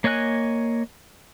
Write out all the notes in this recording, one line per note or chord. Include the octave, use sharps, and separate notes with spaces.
A#3 C#5 D#5 G#5 F#6